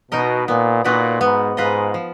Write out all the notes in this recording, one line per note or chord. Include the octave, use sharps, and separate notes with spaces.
B2 D#4 A#4 D#5
A#2 B3
A#2 D#4 F#4 B4 D5
G#2 B3
G#2 F4 B4 D#5
F3